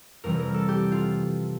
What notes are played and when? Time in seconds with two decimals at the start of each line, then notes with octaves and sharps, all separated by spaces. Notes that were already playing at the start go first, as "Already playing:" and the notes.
0.24 F2 C3 E3 G3 A#4
0.39 A#4
0.54 A4
0.69 G4
0.92 F4